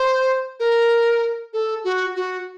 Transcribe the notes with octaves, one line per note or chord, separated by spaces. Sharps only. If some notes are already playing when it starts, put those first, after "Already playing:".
Already playing: C5
A#4
A4
F#4
F#4